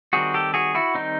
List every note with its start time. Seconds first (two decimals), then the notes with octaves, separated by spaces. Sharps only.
0.13 D#3 G3 C4 F#4 G#4
0.34 G4 A4
0.54 F#4 G#4
0.75 E4 F#4
0.95 D#3 G3 C4 D#4